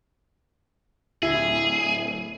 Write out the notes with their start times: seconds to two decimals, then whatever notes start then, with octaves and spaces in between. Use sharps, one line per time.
1.22 D1 E4 G#4